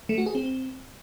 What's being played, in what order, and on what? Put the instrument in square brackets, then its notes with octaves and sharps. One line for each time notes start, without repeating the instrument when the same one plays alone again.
[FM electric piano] A3
F#4
G#4
C4